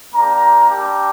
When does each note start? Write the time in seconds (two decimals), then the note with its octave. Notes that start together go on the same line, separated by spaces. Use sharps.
0.13 A#3 D4 G4 A#5
0.69 G3 D4 G4